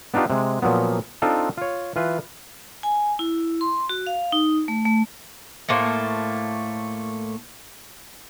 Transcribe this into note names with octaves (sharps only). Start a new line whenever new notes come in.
B3 D4 D#4 F4 G4
C3 G#3
A#2 F3 F#3 B3
C4 D4 D#4 F4 A4
F4 C#5
E3 F4 B4
G#5
E4
C6
F#4
F5
D#4
A3
A3
A2 A3 A#3 C5